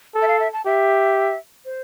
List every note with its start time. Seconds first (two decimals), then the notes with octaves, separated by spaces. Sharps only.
0.15 A4
0.22 E5
0.28 F5
0.40 E5
0.53 A5
0.66 G4 E5
1.65 C5